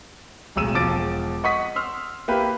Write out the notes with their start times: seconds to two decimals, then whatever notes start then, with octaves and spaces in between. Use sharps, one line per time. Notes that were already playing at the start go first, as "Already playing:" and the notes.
0.56 D1 B1 G#3 E6 D#7 E7
0.74 E1 F3 D6 A6 D7
1.44 D#5 F#5 C#6 D#6 B6
1.76 C6 E6 F6
2.28 A#3 E4 G4 B4